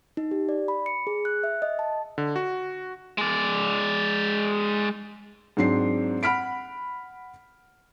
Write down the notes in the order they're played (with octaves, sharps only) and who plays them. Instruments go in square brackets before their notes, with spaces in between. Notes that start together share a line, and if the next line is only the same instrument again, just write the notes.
[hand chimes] D#4
G4
D5
B5
C#7
G#4
F#6
E5
D#5
A5
[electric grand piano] D3
F#4
[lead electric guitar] G#3 D5
[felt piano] G#2 F#3 C4 D4 C7
F#5 B5 F6 B6 D7